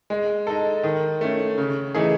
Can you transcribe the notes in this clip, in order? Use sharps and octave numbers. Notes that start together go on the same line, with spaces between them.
G#3
D#4 A4
D#3
A3 C#4
C#3
E3 A3 D#4 G#4